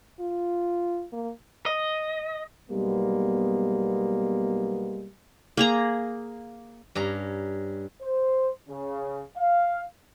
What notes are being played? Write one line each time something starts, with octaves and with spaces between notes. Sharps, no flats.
F4
A#3
D#5
B1 G3 G#3 A#3 B3
A#3 G#4 A#5
G2 C#4 A#5
C5
C#3
F5